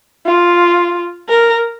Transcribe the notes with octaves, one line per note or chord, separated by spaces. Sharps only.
F4
A#4